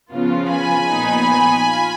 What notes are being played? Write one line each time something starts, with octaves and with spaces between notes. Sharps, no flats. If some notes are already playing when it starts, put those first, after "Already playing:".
C#3 F3 B3 F4
G#5 B5
A#2 F3 B3 D#4
F4